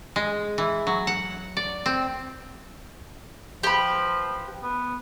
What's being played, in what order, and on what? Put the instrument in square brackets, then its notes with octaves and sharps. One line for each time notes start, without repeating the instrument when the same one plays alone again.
[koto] G#3
E3
F#3
F#5
D5
C4
[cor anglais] F3 [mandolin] G4 B4
[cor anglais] B3